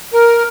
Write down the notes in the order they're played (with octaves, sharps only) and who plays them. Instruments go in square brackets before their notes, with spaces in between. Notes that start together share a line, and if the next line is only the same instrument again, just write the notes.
[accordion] A#4